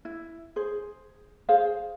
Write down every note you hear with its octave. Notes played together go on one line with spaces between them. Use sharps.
E4
G#4 C5
G#4 C5 F5